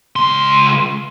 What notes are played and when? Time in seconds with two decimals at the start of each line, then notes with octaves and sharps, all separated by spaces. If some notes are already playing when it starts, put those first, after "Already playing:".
0.16 C#2 C6